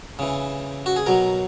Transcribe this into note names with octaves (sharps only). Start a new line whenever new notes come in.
C#3 E3
F#4
G#4
B2 F#3 A#4